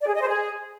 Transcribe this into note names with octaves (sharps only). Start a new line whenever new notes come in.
D5
G#4
D#5
C5
G#4